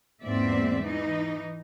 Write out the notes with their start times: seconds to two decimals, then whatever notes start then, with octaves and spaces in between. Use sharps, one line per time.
0.24 E2 G#2 A#3 C4 D5 E5
0.83 E3 D#4